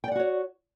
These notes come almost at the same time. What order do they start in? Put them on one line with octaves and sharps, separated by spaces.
G5 D5 F#5 F#4 C#5